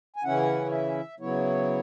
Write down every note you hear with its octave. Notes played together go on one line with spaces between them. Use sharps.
G#5
C#3 E3 C#4 E4 F#5
C#5
E5
C#3 F#3 B3 E4 C#5